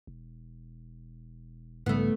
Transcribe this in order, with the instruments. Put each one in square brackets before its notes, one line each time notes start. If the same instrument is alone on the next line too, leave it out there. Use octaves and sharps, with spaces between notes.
[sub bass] E1
[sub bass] A#1 [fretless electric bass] G#2 C#3 G3 [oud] A3 B3